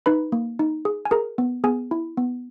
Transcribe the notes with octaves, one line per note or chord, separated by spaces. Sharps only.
D#4 B4 B5
A#3
D#4
G#4
G#5
G#4 A#4 A#5
B3
B3 G#4 G#5
E4
B3